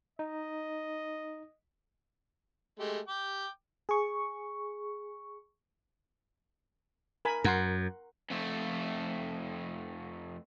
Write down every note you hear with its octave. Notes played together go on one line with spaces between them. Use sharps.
D#4 D#5
G#3 A3 G4
G5 D6
G#4 C#6
A#4 G#5 B5
F#2 A#4 F#5 C6
F2 A3